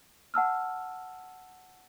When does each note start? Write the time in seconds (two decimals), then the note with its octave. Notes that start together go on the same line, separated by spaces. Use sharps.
0.34 F#5 A5 E6 F6